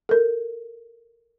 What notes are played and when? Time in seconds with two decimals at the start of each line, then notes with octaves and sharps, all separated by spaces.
0.09 A4 A#4